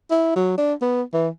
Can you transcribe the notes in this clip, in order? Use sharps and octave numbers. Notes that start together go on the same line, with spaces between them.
E4
F#3
D4
B3
E3